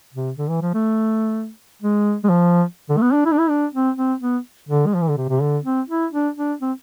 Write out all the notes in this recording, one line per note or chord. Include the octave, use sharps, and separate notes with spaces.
C3
D3
E3
F3
A3
G#3
G#3
F3
D3
A3
B3
D4
E4
D4
E4
D4
C4
C4
B3
D3
G#3
F3
E3
D3
C3
C3
D3
C4
E4
D4
D4
C4